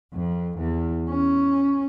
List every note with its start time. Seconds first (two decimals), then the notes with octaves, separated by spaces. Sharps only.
0.13 F2
0.58 E2
1.10 C#4